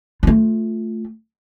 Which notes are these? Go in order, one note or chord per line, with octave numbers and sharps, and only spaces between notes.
A3 F4